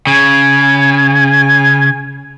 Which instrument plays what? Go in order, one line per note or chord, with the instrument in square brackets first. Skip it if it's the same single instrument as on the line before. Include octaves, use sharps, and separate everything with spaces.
[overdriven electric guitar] C#3 [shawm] G#5